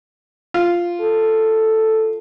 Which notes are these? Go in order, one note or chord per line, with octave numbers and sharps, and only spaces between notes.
F4
A4